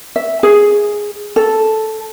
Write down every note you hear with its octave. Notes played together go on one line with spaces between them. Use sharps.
E5
G#4
A4